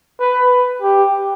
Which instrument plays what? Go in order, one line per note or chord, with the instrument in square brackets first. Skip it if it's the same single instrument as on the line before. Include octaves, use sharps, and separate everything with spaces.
[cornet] B4
G4